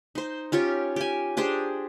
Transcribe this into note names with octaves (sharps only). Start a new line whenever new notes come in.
D#4 C5
C#4 F4 G4 C#5
G4 G#5
D4 G4 G#4 C5